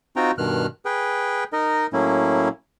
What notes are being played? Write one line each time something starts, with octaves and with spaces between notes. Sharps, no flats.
C4 D#4 F4 F#4 G5 A#5
G2 B2 D#3 F6 F#6
G#4 B4 G5
D#4 A#4 D#5
A2 F#3 A#3 C#4 E4